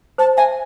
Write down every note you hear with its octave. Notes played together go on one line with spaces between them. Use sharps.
C5 A5
E5 G#5